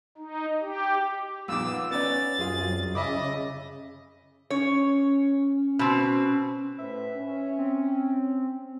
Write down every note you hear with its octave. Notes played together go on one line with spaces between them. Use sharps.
D#4
G4
A#1 D#3 B3 D6 E6
B3 C#4 D5 A6
C2 F#2 F4 G#4
C#3 D#5 E5 B5 D6
C#4 C#5
B2 C4
A2 B4 C5 E5
C#4
C4